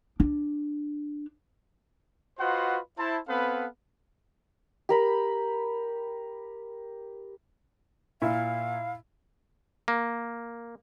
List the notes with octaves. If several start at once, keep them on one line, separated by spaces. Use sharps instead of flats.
D4
F4 F#4 B4 C5 D#5 F#5
E4 C5 A5
B3 C4 A4 B4 F5
G4 A#4 B5
A#2 E4 F5
A#3